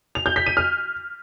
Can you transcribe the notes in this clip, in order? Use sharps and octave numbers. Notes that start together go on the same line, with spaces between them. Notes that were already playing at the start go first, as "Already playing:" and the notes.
F7
G6
B6
D#7
F6